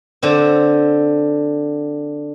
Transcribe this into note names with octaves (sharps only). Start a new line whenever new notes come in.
D3 C4